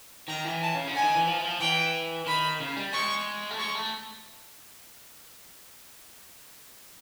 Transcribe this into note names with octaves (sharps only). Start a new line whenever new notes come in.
D#3 A#5
E3
A5
C#3
D3
G#5
D#3
E3
F3
E3
F3
E3 G5
D#3 B5
C#3
G3
G#3 C#6
A3
G#3 C#6
A3